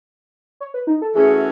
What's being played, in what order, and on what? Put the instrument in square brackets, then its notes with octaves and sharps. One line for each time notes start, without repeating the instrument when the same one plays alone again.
[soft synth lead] C#5
B4
D#4
A4
[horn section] E3 A3 C#4 F#4 C#5 [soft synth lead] G#4